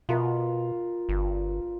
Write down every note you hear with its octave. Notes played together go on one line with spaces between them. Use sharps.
B2 F4 A#4 F5
G1